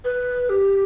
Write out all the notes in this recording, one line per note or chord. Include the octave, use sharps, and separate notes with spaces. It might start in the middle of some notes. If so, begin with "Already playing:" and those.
B4
G4